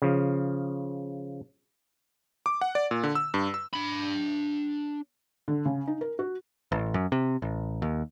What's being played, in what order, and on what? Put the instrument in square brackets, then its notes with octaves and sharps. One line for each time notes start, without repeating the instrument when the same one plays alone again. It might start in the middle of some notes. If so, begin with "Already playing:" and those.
[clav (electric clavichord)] C#3 F3
[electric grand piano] D6
F#5
D5
A#2
D3
E6
G2
E6
[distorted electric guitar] D4 B5
[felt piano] D3
C#3
D#4
A#4
F#4
[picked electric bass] A1
F#2
C3
A1
D#2